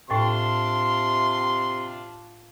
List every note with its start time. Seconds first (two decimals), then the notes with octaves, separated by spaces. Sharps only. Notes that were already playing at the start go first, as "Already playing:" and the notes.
0.10 A2 C3 D4 F4 G5 C6 A6